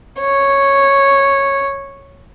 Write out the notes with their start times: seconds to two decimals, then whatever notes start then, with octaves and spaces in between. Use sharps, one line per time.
0.20 C#5